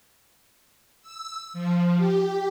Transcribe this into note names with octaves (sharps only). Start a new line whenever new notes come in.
E6
F3
G4